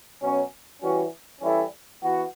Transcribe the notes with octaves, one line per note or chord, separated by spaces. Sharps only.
B2 F#3 C#4
E3 G3 C#4 F#4
E3 G3 C#4 E4 A4
E3 B3 F#4